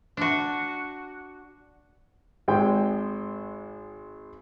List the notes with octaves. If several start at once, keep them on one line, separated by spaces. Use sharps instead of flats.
D4 F#4
G#1 G#3 G5